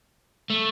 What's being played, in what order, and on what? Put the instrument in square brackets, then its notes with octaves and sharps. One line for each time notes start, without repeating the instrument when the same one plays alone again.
[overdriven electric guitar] A3